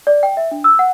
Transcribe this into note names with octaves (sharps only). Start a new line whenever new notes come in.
D5
G5
E5
D4
E6
F#5